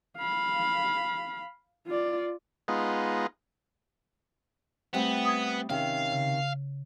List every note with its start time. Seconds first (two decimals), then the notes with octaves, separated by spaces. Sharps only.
0.17 F5 B5
1.87 F4 D5
2.68 G#3 B3 D#4 F4
4.94 G3 A3 B3 C4
5.25 D#6 G#6
5.70 C3 D#3 C#4 F5
6.12 C#3